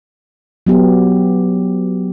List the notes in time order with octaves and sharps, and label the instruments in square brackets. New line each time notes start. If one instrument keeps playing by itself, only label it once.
[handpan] F#3 B3 G4